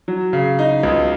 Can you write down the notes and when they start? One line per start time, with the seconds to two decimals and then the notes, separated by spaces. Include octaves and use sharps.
0.08 F#3
0.33 C#3
0.59 D#4
0.83 C#2